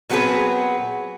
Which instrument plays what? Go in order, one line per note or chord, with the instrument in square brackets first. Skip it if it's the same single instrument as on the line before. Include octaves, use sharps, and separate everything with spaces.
[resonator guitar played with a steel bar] A#2 F#3 B3 C4 G#4 B4